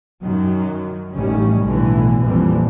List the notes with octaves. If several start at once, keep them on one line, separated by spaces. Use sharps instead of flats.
F#2 D#3 F#3
A1 F#2 D#3 G3 C#4
B1 A2 D3 E3
A#1 F2 A#2 E3 G3